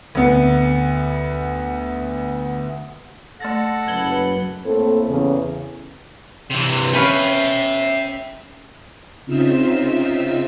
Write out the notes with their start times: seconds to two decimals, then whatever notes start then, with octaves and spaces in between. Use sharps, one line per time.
0.15 D2 B3
3.40 A3 A4 F#5 A6 A#6
3.88 F#1 F#2 B4 G#6 F#7 G7
4.65 A2 A#3 C4 A4
5.08 E2 C#3
6.51 C3 E3
6.94 C#4 B4 E5 F5 G5
9.26 C#3 C4 D#4 F4 E5 E6